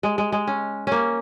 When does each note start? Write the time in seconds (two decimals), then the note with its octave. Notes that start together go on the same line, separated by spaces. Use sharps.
0.03 G#3
0.18 G#3
0.32 G#3
0.47 C#4
0.87 A#3 C#4